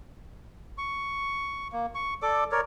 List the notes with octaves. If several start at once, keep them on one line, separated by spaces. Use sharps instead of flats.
C#6
A#3
C#6
A4 D5 D6
A#4 C#5 D5